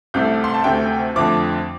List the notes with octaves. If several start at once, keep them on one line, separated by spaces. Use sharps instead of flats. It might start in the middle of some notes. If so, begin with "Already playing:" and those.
C2 C3 A3 G6
C6
A5
D2 C3 A3 G5
F2 D3 F3 A3 D6